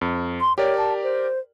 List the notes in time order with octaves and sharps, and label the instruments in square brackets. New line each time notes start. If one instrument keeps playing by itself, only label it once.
[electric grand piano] F2
[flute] C6
[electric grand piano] G4 A#4 D5 [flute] C#5
[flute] A5
C5